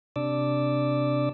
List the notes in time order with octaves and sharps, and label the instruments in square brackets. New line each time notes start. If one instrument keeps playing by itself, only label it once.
[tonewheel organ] C3 D4 D5 D6 E6